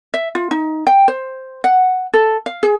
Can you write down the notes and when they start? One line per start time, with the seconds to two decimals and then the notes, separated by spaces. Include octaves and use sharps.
0.14 E5
0.35 F4
0.51 D#4
0.87 G5
1.08 C5
1.64 F#5
2.14 A4
2.46 F5
2.63 G#4